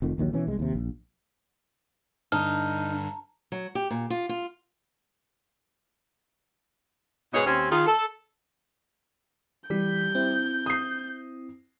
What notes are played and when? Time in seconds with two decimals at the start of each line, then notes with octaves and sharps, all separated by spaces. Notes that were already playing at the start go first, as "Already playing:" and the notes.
0.02 F1 F2 D#3
0.18 A#1 D#2 D#3 F#3
0.33 B2 E3 C#4
0.47 C2 G#3
0.59 D#2 C3
0.74 A#1
2.32 G2 D3 D#4 A5 A#5 F6
3.52 F#3
3.75 G4
3.90 A#2
4.10 F4
4.29 F4
7.33 G#2 B2 D#4 G#4 B4 C#5
7.45 D#2 C4 C#4
7.71 D#3 F4 G#4
7.86 A4
9.70 E3 G3 G6 B6
10.15 C4 E4
10.66 D#6 C7